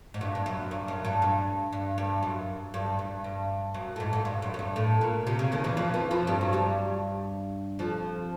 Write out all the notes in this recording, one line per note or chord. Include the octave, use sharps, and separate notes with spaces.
G#2
G2
G2
F#2
G2
F#2
G2
G2
G2
G2
F#2
G2
G2
G2
F#2
A2
G#2
G#2
G2
F#2
F#2
G2
A2
A#2
C3
C#3
D#2 D#3
E2 E3
F2 F3
E2 E3
F2 F3
G2 G3
F#3
G2 G3
F2 F3